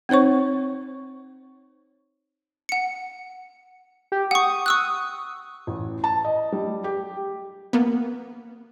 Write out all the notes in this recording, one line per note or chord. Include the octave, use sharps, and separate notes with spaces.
C4 D#4 C5 C#5 C#6
F#5 C#7
G4
F#5 C#6 D#6
C#6 E6 F#6
A1
A5
D#5
G3
G4
A#3 B3